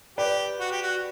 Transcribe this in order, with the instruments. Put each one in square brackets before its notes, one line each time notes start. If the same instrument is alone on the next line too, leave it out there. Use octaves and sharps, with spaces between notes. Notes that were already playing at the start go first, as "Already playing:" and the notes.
[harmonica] G4 [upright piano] B4 D5
[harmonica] F#4
G4
F#4